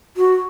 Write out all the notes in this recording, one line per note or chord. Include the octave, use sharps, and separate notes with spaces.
F#4